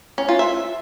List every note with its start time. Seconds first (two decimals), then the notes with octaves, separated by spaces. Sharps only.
0.18 C#4
0.29 F4
0.39 E5